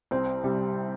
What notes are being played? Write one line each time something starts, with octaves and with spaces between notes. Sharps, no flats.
C2 C4
C3 G3